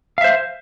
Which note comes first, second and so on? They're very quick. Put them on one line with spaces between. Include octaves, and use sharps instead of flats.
F5 E5 C5